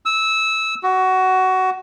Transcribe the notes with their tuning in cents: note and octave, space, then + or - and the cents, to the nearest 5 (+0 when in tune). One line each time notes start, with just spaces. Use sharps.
E6 -15
F#4 +15